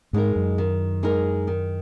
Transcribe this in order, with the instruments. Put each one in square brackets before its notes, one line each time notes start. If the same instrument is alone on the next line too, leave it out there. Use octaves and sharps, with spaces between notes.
[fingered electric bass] G#2 [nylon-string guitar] G#3 D#4 A#4
[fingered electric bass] F#2
[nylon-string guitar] D#3
G#3 D#4 A#4
D#3